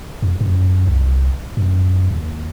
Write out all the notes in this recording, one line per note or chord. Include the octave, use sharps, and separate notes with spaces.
F2
F#2
C2
F#2
D#2